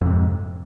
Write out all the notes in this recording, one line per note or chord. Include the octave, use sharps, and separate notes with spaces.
F2 G#2 C3